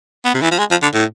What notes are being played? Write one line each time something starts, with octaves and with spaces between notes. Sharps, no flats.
B3
C3
E3
F3
G#3
F3
D3
A2